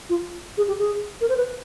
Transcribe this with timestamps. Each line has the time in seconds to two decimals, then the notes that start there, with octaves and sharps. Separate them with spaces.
0.09 F4
0.57 G#4
0.68 G4
0.79 G#4
1.21 A#4
1.29 C5
1.37 B4